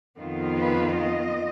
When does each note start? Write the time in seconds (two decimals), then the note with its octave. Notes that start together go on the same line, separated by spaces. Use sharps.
0.18 F2 D#3 B3 F4
0.57 B4
0.95 D#5